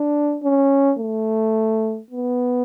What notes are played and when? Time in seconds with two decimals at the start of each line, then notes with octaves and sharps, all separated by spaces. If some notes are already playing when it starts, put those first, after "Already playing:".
Already playing: D4
0.43 C#4
0.99 A3
2.11 B3